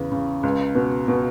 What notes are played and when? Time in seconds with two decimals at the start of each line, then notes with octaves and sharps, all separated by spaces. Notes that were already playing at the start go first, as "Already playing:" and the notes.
Already playing: E2 C#3 B3
0.12 C#3
0.43 C#2
0.75 B2
1.08 B2